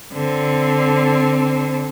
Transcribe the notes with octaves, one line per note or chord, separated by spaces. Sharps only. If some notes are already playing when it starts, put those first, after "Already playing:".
D3 C4